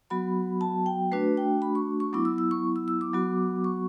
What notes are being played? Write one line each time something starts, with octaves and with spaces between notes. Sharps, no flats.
F#3 B3 F#4 B5
A5
G5
A3 D4 F#4 B4
G5
B5
C#6
C#6
F#3 B3 E4 D6
E6
E6
C#6
E6
E6
D6
F#3 B3 F#4
C#6